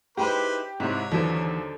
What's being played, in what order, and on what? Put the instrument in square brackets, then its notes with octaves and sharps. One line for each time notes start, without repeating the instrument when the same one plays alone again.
[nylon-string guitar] D#4 E4 G#4 [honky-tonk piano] G4 [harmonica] B4 C5 D6
[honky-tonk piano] G#2 C3 G#3 [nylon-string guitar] E4 [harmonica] C#5
[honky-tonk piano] D#2 F#3 [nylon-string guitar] D3 C5 [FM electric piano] E3